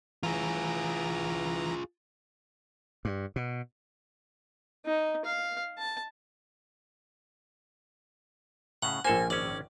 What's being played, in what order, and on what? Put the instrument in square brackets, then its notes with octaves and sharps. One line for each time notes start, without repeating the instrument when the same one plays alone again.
[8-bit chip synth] E3 A#5 [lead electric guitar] F4 G#4
[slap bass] G2
B2
[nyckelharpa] D#4
F5
A5
[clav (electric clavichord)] A2 C#3 [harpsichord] F#5
[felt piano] A#1 A#4 C5 [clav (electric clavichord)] A#3 A4 [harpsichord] G#5
[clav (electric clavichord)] G#1 C#4 [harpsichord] D5